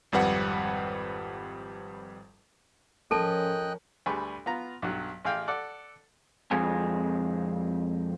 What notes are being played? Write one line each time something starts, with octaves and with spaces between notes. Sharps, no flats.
G#1 F2 G3 B4 F#5
F3 C#4 A4 A#4 D#5 G5 A5 F#6
D2 G3 G#4 B4 C#6
B3 F4 A#5
B1 G2 F#3
A1 G#4 F5 G5
A4 D5 F#5
F2 G#3 C4 G#5